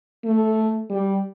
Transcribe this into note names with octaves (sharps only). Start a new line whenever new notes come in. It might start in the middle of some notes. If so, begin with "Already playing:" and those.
A3
G3